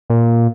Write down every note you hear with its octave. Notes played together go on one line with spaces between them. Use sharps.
A#2